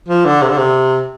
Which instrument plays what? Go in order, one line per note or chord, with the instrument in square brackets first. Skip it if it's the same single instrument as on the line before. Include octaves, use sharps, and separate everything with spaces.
[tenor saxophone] F3
D3
C3
D3
C3